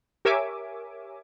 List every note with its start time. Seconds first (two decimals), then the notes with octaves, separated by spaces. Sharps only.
0.25 G4 A#4 C#5 E5 G#5 D6